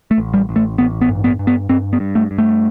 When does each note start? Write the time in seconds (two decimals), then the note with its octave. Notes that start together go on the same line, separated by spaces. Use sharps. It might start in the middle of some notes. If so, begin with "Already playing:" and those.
0.11 A3
0.18 A1
0.34 G3
0.49 A1
0.56 A3
0.78 A1 B3
1.01 B3
1.09 G2
1.24 B3
1.39 G2
1.47 B3
1.69 G2 C4
1.93 B3
2.00 G2
2.15 A3
2.31 G2
2.38 A3